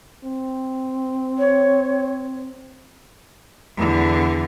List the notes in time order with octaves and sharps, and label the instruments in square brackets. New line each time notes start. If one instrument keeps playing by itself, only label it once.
[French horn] C4
[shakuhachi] C#5
[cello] E2 D3